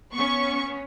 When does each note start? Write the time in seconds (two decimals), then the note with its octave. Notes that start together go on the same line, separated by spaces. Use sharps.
0.14 B3 C#4 C#6